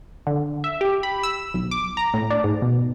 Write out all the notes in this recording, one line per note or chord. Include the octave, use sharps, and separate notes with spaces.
D3
E5
G4
B5
E6
B1
D6
A#5
A2
D4
G#2
B2